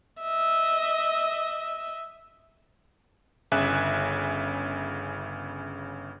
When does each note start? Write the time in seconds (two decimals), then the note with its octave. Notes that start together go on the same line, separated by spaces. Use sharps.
0.22 D#5 E5
3.52 G1 C#3 E5 G#5 F#6